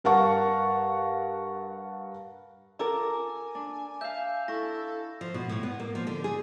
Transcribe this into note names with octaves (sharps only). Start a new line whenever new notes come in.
G2 A#4 F5 F#5 A5 C#6
F4 A4 A#4 A#5 D6 E6
G#5
D4
E5 F5 G6
E4 A4 C#6 A#6
F3
B2
A2
B3
A#3
F3
D3
G#4